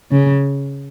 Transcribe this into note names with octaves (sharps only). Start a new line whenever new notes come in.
C#3